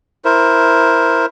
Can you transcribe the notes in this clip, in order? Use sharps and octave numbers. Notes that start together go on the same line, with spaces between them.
E4 A#4 C5